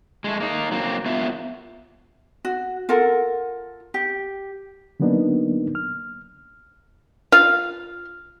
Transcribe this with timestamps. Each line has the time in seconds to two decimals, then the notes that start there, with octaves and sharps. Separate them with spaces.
0.24 G#3 A3
0.40 A#3 D#4
0.71 F#3 A#3 C4
1.06 B3 F4 A#4 E5 F5
2.45 F#4
2.89 F4 A4 A#4 F#5
3.94 G4
5.00 D3 F#3 A#3 B3 D4 D#4
5.75 F6
7.32 F4 F5